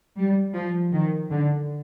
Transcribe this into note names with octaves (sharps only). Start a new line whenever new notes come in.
G3
F3
D#3
D3